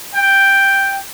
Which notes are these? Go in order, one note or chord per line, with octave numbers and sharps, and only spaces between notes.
G5